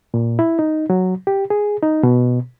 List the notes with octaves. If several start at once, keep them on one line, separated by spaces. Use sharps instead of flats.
A#2
E4
D#4
F#3
G4
G#4
D#4
B2